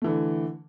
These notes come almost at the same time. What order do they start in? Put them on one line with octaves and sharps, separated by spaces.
A3 E3 D3